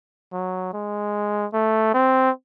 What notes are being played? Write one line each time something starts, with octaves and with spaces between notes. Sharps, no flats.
F#3
G#3
A3
C4